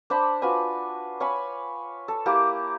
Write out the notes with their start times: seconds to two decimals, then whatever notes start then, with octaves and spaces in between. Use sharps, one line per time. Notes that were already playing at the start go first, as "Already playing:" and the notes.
0.10 D4 C5 A5 B5
0.42 F4 F#4 B4 G#5
1.20 C#5 F5 G#5 B5
2.08 A4
2.26 A#3 E4 G4